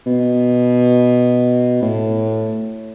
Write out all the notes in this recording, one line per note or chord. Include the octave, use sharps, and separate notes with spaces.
B2
A2